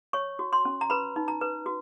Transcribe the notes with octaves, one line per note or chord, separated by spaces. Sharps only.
C#5 C#6
F#4
C6
C#4
A#5
B4 B5
D#4
A#5
B4
F#4